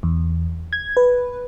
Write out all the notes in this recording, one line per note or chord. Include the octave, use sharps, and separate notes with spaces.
E2
G#6
B4